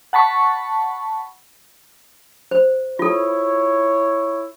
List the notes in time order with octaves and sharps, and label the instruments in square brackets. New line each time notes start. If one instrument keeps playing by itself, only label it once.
[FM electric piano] F#5 A5 B5 C#6
[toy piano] C5
[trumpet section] E4 C#5 [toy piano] F4 A4